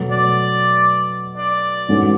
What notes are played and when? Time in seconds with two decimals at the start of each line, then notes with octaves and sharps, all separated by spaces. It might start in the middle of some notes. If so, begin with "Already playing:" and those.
Already playing: B2 F#3 A3
0.12 D5
1.38 D5
1.88 G#2 E3 A3 C#4 F#4